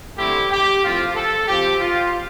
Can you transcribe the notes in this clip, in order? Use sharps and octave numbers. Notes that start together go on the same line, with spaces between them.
D3 A3 C4 E4 G4
G4
A2 F3 C4 F4
A4
F3 C4 F4 G4
F4